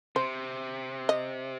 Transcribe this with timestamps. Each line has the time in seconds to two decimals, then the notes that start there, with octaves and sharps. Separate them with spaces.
0.16 C3 C5
1.09 D#5